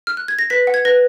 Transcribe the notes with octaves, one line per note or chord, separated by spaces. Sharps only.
F6
F#6
G#6
A#6
B4 B6
F#5
G#6
B4 A#6